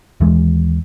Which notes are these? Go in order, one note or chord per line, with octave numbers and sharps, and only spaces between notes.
D#2 E3 G#3